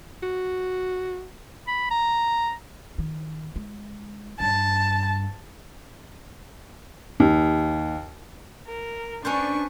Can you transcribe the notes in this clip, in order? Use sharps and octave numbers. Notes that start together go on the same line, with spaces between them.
F#4
B5
A#5
D#3
G#3
G2 A5
D#2
A#4
C#4 D4 B4 C5 C#6